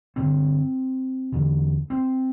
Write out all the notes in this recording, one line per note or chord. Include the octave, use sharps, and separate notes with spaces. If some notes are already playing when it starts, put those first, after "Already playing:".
G2 D3 C4
E2 D3
C4